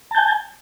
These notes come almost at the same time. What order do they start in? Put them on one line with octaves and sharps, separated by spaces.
A5 G6 G#5